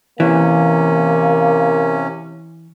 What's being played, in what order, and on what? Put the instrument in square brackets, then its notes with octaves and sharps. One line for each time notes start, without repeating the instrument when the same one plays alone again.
[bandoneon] C3 C#4 [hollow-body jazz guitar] E3 [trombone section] A#3